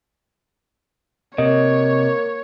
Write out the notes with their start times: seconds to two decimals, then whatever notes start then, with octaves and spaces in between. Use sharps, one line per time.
1.38 C3 A#3 C#5 D#5